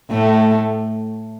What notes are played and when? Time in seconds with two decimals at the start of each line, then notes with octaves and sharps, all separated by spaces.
0.11 A2 A3